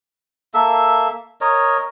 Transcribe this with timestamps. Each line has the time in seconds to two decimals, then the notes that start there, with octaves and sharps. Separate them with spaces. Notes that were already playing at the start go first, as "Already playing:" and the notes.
0.54 A#3 A4 E5
1.41 A#4 C#5 D#5